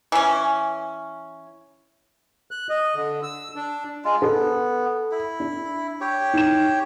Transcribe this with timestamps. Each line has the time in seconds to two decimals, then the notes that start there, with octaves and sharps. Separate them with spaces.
0.12 E3 C#4
2.51 F#6
2.70 D#5
2.95 D3
3.23 E6
3.56 D4
4.05 G#3 F4
4.22 B3 A4
5.11 E4
5.40 D4
6.01 G4 C#5
6.34 D#4 E7